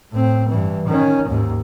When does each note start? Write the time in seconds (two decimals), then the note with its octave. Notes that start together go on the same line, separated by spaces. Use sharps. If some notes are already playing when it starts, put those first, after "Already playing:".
0.12 A2 C4
0.49 G2 E3
0.87 D#3 C#4
1.28 D#2 G#2